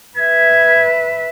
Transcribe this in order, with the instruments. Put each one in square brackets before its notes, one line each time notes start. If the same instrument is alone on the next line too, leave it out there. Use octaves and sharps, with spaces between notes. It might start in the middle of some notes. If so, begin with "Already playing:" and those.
[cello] B4 E5 [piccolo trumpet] G#6